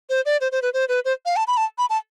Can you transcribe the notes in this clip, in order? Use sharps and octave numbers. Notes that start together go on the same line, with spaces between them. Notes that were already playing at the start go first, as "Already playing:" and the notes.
C5
D5
C5
C5
B4
C5
B4
C5
F5
A5
B5
A5
B5
A5